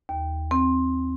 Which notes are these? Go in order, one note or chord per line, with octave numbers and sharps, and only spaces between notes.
D#2
C4